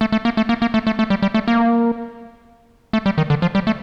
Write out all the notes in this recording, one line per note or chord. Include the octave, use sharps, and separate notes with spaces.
A3
A3
A#3
A3
A#3
A#3
A3
A3
A3
G3
G3
A3
A#3
A3
G3
D#3
D3
F3
G3
A3